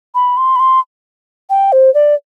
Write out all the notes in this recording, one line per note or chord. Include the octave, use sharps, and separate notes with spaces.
B5
C6
B5
C6
G5
C5
D5